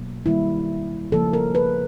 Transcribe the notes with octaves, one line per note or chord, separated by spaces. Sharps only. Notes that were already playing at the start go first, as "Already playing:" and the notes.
Already playing: B2 F#3 A#3
D#3 G3 A#3 E4
C#3 F3 A#3 A4
A#4
B4